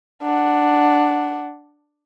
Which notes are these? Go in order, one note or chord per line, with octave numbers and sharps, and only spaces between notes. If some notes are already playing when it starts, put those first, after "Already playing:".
D4 F#5